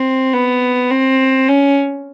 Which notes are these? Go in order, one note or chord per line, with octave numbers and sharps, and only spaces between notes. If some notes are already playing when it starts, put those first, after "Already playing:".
Already playing: C4
B3
C4
C#4